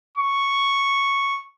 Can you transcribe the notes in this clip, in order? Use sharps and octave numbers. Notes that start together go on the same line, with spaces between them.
C#6